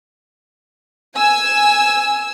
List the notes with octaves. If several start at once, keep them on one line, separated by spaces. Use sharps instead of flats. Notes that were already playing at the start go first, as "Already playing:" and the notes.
G#5 E6